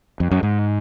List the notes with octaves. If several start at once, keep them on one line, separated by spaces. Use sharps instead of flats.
F2
F#2
G#2